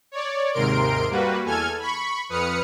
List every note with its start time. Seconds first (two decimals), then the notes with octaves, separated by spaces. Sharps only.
0.12 C#5 D5
0.52 D#2 G#2 C3 A#4 C6 D7
1.10 G3 A#3 F#4 B4
1.44 E2 A4 G#5 F6 G#6
1.80 B5 C#6
2.29 F2 B4 D#6 F6 C#7